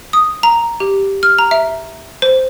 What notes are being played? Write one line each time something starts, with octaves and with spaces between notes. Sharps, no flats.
D#6
A#5
G4
F6
A#5
E5
C5